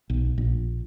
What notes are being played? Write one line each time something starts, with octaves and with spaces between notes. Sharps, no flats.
B1
A#1